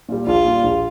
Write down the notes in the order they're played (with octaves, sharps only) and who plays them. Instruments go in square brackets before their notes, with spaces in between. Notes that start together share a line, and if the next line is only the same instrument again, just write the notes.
[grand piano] A#2 G3
[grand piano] A#1 [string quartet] F4
[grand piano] A#2 G3
A#1